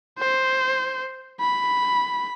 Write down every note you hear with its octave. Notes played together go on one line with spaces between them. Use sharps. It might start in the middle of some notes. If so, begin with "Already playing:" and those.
C5
B5